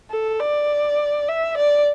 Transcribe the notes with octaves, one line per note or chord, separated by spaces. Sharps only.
A4
D5
E5
D5